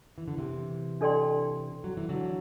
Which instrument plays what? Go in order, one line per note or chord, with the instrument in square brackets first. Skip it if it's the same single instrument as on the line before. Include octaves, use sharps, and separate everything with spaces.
[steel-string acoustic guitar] E3
D3
C3 E3
[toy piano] D4 A4 D5 G5 C6
[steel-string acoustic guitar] F#3
E3
D3 F#3